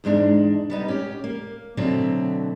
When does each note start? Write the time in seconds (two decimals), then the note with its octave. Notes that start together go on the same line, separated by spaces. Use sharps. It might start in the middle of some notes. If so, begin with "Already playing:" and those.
0.04 E2 G#2 G#3 D4
0.70 G3 B3 D#4
0.88 C#4 G4
1.24 A#3
1.77 B2 D3 F#3 A3 C4